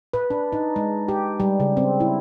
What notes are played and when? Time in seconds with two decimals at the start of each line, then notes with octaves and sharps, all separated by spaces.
0.13 B4
0.30 D4
0.52 D#4
0.76 G#3
1.08 G4
1.40 G3
1.60 C#3
1.77 C4
2.00 E4